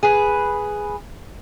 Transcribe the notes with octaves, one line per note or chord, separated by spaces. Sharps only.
G#4 B4